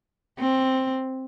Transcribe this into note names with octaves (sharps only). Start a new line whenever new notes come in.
C4